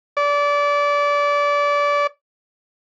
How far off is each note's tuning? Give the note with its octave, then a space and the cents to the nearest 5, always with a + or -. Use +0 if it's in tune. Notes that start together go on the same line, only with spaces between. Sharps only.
D5 -25